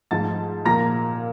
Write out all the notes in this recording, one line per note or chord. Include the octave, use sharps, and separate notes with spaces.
G#2 F3 A3 A5 A6
A#2 F3 A#3 A#5 A#6